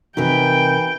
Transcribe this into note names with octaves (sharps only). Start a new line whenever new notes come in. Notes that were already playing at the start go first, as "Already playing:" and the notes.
C3 E3 D#4 F#4 A#4 E5 G5